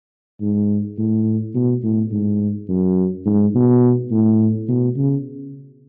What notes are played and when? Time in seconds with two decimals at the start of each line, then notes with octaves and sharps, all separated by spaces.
0.40 G#2
0.98 A2
1.54 B2
1.83 A2
2.11 G#2
2.68 F#2
3.26 G#2
3.54 B2
4.11 A2
4.68 B2
4.97 C#3